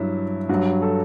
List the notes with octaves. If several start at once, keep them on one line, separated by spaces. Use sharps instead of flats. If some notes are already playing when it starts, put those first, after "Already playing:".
Already playing: G2 F#3 E4
G2 F#3 F#4
A4